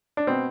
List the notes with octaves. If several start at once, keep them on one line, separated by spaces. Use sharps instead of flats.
D4
B2 B3 C4